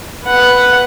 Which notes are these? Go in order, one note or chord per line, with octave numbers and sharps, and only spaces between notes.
B4 F#5